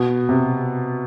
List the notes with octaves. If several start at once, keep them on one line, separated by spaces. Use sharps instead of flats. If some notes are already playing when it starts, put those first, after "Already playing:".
Already playing: B2
C3